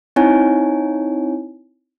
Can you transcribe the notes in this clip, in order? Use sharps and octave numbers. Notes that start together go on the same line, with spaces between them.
C4 D#4 E4 C#5 G#5